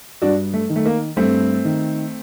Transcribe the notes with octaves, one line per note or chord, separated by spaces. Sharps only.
G2 D4 F#4
A3
D#3
A3
A#3
G2 A3 C4
D#3